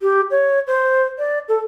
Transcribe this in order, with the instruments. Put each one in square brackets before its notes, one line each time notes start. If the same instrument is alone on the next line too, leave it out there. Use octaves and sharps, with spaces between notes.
[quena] G4
C#5
C5
D5
A4